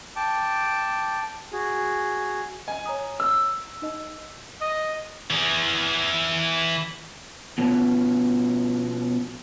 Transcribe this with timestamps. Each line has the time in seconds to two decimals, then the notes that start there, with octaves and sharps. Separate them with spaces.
0.16 G5 A5 D6
1.52 F#4 G#4
2.68 D#5 G#5
2.86 C#5 A#5 D#6
3.20 E6
3.82 D#4 D#5
4.61 D#5
5.30 E3 G#4
7.58 B2 F3 B3 C#4